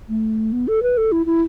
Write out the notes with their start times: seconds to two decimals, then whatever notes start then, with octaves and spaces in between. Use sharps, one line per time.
0.09 A3
0.52 B3
0.68 A4
0.83 B4
0.97 A4
1.12 E4
1.26 E4